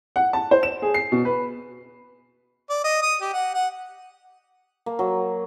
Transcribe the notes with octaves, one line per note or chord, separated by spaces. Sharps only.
F#5
A5
C5
E7
G#4
C7
B2
B4
D5
D#5
D#6
G4
F#5
F#5
A#3
F#3